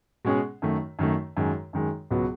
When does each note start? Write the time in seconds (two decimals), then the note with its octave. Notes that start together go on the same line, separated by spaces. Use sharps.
0.25 B2 G#3 C#4 G#4
0.62 F#2 D#3 A3
0.99 F#2 D#3 A3
1.37 F#2 D#3 G#3
1.73 F#2 D#3 G#3
2.11 C#2 B2 F#3 B3